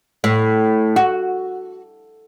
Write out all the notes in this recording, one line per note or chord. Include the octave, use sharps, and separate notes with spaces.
A2
F#4